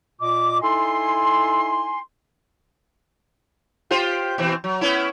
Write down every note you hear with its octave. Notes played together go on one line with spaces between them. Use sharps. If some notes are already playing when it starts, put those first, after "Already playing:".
A#2 F4 D#5 D6
D#4 E4 A4 G#5 C6
F4 G4 C5
B2 E3 C4
F#3
B3 C#4 E4